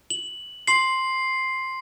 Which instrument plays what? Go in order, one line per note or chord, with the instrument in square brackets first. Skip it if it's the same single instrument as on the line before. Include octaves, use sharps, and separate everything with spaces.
[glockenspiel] F#7
[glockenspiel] C6 F#7 [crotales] C7